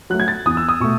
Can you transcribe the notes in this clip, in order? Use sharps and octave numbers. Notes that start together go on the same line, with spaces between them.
F#3 A3 F#6
G#6
A6
E2 D#6
E6
D#6
B2 A3 C#6